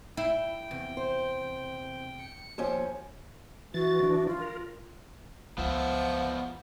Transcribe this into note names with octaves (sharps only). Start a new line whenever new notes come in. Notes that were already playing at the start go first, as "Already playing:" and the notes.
E4 G5
E2 C3
C5
C#7
D#2 F3 C#4
E3 F#4 A6
E3 D4
F4
A#4
C#2 F3 B3 F4 E5 F#5